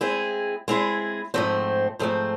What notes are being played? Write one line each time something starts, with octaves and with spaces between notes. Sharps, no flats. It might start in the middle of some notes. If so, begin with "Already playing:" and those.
G#3 C4 E4 G#4
G#3 C4 E4 G#4
G#2 F3 A3 C4
G#2 F3 A3 C4